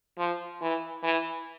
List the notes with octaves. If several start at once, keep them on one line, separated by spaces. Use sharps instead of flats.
F3
E3
E3